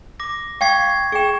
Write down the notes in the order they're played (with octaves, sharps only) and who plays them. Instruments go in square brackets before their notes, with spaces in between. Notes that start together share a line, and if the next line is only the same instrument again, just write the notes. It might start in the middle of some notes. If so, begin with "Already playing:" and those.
[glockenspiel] D6 A#6
[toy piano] F5 G5 [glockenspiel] C#6 G#6 C7
[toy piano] G#4 G5 [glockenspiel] C#6 E7